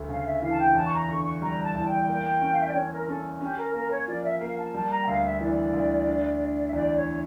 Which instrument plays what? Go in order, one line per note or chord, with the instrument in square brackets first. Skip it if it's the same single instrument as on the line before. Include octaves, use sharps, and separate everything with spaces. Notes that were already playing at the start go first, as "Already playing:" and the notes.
Already playing: [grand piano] D2 A3
[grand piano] C#3 [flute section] F5
[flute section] E5
[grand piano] E3 [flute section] F5
[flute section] A5
G5
[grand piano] E2 [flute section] A5
[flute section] C#6
A#5
[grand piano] D3 [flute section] C#6
[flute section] C#6
[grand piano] G3 [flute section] A#5
[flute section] A5
[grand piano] E2
[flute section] G5
[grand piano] A#3 [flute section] G5
[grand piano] C#4
[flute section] F5
E5
D5
[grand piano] C#4 [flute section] C#5
[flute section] A#4
[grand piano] C#4 [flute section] A4
[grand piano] C#4 [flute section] G4
[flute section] A#4
[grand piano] A#3 [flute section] A#4
[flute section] C#5
[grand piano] F3 [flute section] D5
[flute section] E5
[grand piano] A#3 [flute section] F5
[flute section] A5
[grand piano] G3 [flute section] A5
[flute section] A#5
G5
[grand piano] D2 [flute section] F5
[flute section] E5
[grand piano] E3 [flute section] D5
[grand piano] D2
D4
D4
[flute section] E5
[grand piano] E2 [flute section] D5
[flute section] C#5